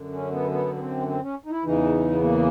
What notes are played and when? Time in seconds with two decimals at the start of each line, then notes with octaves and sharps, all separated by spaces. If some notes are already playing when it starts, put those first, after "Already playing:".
Already playing: F#2 D3
0.13 C#4
0.32 B3
0.51 B3
0.75 B3
0.79 C4
1.08 C4
1.22 C#4
1.45 D#4
1.51 E4
1.64 E2 C#3 E3 D#4
2.13 B3
2.22 A#3